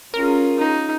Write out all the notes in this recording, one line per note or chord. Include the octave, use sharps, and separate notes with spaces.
C#4 F4 G#4 A#4
D#4